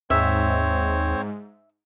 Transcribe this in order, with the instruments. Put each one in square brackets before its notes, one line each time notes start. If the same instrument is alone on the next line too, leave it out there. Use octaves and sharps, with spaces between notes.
[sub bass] D#2 [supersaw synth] G#2 [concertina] C4 C#5 [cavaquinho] E5